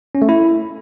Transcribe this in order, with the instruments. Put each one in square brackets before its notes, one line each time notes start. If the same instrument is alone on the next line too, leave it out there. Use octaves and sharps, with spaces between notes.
[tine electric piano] C#4
A3
E4